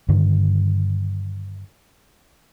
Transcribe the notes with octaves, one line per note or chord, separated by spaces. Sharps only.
G2 D3 D#3